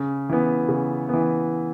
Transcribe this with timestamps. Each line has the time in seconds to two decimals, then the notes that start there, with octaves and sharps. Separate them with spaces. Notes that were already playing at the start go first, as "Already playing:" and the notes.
Already playing: C#3
0.29 E3 B3
0.69 C#3
1.09 E3 B3